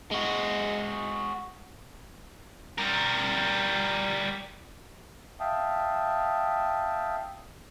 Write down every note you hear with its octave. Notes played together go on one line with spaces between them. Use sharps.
G#3 F#4
G3 A#4
E5 F5 G5 A5 D#6